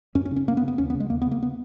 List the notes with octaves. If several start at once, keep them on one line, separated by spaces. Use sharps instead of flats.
F#2 C#4
C#4
C#3
C#4
F#2 A#3
B3
C#3
B3
D#2 C#4
B3
C#3
G#3
D#2 A#3
B3
C#3 A#3
B3